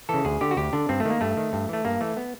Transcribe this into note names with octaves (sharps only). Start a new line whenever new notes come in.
C#3 E3 A4
D2 G#4
D3 G4
F#4
D2 G4
D3 D4
G2 C4
A3
D#3 A#3
G2 A3
D#3
G2
E3 A3
G2 A#3
E3 A3
B3